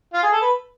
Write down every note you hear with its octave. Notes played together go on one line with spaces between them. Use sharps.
F4
G#4
A4
B4